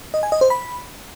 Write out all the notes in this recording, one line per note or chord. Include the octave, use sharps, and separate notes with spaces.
D#5
G#5
D#5
C5
B5